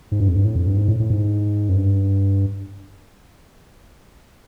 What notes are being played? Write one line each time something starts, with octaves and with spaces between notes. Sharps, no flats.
G#2
G2
F2
G2
A2
F2
G2
G#2
A2
A2
G#2
F#2
G2